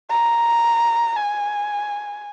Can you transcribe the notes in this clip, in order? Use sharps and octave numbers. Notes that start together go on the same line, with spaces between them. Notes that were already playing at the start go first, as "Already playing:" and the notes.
A#5
G#5